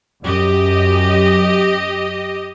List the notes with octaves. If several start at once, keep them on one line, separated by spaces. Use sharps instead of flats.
F#2 G4 D#5